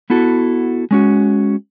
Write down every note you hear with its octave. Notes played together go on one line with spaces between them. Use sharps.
B3 E4 F#4 A4
G#3 C#4 F#4